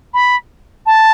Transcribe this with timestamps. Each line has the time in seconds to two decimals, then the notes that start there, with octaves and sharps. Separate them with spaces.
0.14 B5
0.86 A5